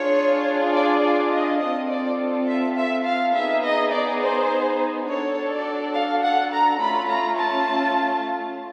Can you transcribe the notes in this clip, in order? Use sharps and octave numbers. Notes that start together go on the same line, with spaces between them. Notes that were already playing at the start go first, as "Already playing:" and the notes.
Already playing: D4 F4 G#4 C#5
D5
D5
D#5
C4 F4 A4 D#5
D5
E5
E5
F5
B3 D#4 G#4 E5
D#5
D5
C5
D4 F#4 A4 C#5
D5
F5
F#5
A#5
A3 C#4 F4 B5
A#5
A5